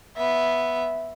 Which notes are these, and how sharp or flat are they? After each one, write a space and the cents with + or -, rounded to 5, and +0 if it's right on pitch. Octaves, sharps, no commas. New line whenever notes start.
B3 +0 E5 +0